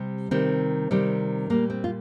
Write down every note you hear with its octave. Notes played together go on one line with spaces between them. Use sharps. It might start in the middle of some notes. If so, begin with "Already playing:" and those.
Already playing: C3 G3
C3 D#3 G3 C4
C3 D#3 G3
A#2 G3 A#3
C4
F4